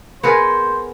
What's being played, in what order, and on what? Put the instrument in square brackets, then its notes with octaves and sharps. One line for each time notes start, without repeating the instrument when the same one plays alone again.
[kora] B3 G#4 A#4 [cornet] C5